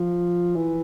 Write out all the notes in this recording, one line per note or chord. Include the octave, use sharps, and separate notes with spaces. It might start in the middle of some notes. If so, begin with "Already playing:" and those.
Already playing: F3
E3